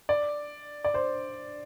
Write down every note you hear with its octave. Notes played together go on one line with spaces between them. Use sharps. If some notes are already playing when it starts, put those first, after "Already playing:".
D5
D5
C5